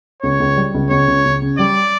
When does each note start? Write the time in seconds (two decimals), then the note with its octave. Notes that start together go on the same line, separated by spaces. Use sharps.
0.22 C#2 C#5
0.40 C#2
0.57 G3
0.74 C#2
0.90 C#2 C#5
1.08 C#2
1.25 C#2
1.42 C#3
1.58 G3 D5